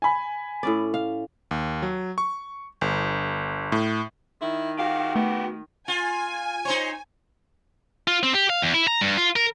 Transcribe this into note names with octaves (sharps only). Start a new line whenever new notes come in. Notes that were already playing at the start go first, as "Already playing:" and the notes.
G#5 B5
A2 C#4 D5
F5
D#2
F#3
C#6
G1
A2
D#3 E4
F#4 G4 F5
A3 B3
F4 G#5
D#4 C5 C#5
F4
C4
G4
F5
E2
E4
A#5
G2
F4
A#4